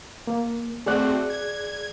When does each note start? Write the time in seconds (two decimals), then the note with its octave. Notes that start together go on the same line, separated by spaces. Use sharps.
0.27 A#3
0.86 A3 C4 F#4 G#4 D5 F#6
1.30 G#6